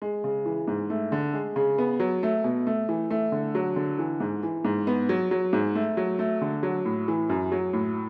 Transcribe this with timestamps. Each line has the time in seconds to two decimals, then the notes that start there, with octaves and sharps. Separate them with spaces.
0.02 G#3
0.24 C#3
0.46 E3
0.68 G#2
0.90 A3
1.12 D3
1.34 G#3
1.56 C#3
1.78 B3
2.00 F#3
2.23 A3
2.44 B2
2.67 A3
2.89 E3
3.10 A3
3.32 D3
3.55 F#3
3.76 D3
3.98 E3
4.20 G#2
4.43 E3
4.65 G#2
4.87 B3
5.09 F#3
5.31 F#3
5.53 G#2
5.75 A3
5.97 F#3
6.19 A3
6.42 D3
6.63 F#3
6.85 A2
7.08 E3
7.30 F#2
7.52 F#3
7.73 A2